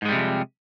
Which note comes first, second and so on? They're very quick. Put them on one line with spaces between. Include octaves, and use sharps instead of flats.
G#2 G#3 G3 C3 F2